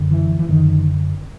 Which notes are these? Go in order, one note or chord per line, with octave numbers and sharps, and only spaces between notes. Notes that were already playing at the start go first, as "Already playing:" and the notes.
Already playing: F#2 D3
E3
E3
F#2 D3 D#3